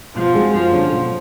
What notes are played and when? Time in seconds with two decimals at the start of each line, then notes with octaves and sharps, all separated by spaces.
0.16 B2 F3
0.34 G#3 C4 D#4 F#4
0.53 F#2 F3
0.72 D3 F#3 A3 C#4
0.92 B2